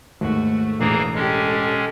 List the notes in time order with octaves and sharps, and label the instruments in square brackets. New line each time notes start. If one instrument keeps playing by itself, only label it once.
[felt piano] D#2 G#2 [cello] A3 [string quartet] F#4
[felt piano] E1 A1 [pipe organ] E3 A#3 G#4 [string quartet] A#5
[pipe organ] G#3 C#4 [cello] G4 [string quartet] A4